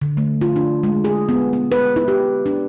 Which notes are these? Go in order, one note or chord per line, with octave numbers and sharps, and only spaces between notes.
D3
A3
F4
D4
G#3
G#4
B3
B3
B4
E4
G4
D4